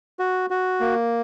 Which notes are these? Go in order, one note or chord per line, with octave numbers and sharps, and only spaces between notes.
F#4
F#4
A#3